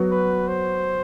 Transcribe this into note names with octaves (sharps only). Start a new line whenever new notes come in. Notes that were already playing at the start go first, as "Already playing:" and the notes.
Already playing: F#3 B3 F#4
B4
C5